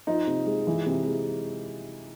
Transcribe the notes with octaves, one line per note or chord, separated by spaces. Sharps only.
F3 D#4 F4
C3
G#3
E3
C3
G#3